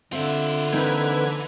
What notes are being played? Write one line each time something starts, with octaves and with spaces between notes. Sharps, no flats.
D3 C4 F4 E5
E3 A#3 C4 D#4 B4 G#6